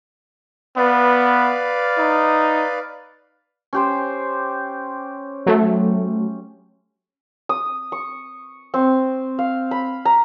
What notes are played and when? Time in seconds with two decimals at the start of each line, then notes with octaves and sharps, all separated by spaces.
0.77 B3 B4 D5 F5
1.98 D#4
3.73 C#4 G4 C5
5.46 F#3 A3
7.49 D#6
7.92 C#6
8.74 C4
9.39 F5
9.71 B5
10.05 A#5